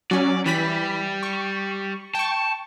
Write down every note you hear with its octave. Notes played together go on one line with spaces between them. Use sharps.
F#3 C#4 D5
E3 G3 B5 B6
C#6
G5 A5 C#6